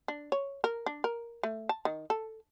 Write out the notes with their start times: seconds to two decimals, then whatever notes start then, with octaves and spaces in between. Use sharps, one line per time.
0.08 D4
0.32 C#5
0.64 A#4
0.86 D4
1.04 A#4
1.43 A3
1.69 A5
1.85 D#3
2.10 A4